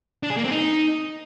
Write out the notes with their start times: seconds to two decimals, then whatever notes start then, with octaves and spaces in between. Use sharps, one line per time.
0.23 D4
0.30 G#4
0.37 A#3
0.44 C4
0.51 D#4